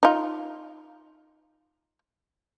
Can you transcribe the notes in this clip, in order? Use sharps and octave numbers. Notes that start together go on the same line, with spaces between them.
D#4 F4